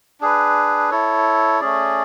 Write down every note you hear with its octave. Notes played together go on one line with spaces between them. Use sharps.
D4 G#4 B4
E4 A4 C#5
A3 C#4 G#4 D5